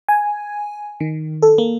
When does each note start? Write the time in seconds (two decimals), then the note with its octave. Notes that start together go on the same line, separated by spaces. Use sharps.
0.09 G#5
1.00 D#3
1.42 A4
1.58 A#3